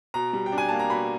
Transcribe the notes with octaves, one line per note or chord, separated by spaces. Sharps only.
B2 A#5
G3
G5
D4
G#5
A#3 A5
A#5
B2 B5